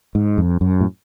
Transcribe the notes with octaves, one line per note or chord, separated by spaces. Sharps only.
G#2
F2
F#2
A2